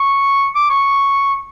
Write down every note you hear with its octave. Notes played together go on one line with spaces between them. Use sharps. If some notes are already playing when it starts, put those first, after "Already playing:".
Already playing: C#6
D6
C#6